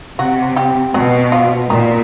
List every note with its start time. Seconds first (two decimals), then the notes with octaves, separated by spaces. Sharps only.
0.18 C3 F#3 F#4
0.56 G3 G4
0.94 B2 F#3 F#4
1.32 F3 F4
1.70 A#2 D#3 D#4